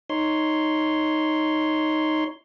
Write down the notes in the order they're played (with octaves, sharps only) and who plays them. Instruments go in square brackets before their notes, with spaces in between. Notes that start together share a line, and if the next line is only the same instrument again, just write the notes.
[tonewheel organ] D#4 C#5 C6